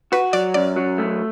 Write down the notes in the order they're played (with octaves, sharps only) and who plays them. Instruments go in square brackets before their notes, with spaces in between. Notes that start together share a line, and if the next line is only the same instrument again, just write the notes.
[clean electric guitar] F#4 [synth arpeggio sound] B4
[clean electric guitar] F#3 [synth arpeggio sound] D5
[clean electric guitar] F#2 [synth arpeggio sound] D5
[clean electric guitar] F#3
A3